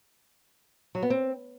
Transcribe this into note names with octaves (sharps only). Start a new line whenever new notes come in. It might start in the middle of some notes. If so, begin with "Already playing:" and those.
F#3
B3
C4